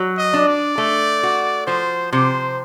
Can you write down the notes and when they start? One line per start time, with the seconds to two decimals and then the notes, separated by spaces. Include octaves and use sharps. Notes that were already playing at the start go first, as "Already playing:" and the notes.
Already playing: F#3
0.18 D#5
0.33 D4
0.48 D5
0.78 A3
1.23 F#4
1.67 F3 C5
2.13 C3 C5